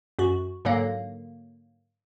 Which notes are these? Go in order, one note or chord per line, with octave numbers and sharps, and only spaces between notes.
F#2 F#4
G#2 D3 F#3 A#3